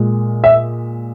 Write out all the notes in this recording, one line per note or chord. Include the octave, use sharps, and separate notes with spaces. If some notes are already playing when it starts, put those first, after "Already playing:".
Already playing: A#2 G#3
E5